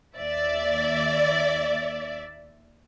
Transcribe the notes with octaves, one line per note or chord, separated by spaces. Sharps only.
D#2 D5 E5